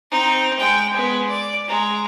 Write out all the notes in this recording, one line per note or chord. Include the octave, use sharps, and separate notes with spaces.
C4 D#4
G#3 G5
G#3 B3
D5
G#3 A#5